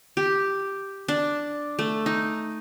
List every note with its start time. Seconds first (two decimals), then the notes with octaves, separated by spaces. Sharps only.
0.17 G4
1.08 D4
1.79 A3
2.06 D#4